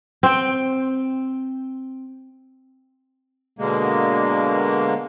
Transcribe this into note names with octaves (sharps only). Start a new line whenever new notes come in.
C4 G5
B2 D3 G#3 A#3